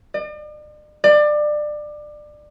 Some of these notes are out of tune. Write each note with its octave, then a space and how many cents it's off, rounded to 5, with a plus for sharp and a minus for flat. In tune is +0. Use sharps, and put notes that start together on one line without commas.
D5 +45
D5 +25